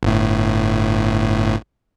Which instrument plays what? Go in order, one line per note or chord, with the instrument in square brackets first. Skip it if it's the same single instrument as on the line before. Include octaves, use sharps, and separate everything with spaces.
[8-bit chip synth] G1 A2